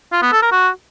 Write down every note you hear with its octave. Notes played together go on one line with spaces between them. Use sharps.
F4
B3
A4
A#4
F#4